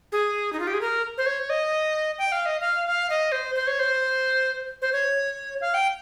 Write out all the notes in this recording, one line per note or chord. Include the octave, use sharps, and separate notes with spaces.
G#4
D#4
F4
G4
G#4
A#4
C5
C#5
D#5
G5
F5
D#5
F5
F5
D#5
C5
C5
C#5
C5
C5
C#5
F5
G5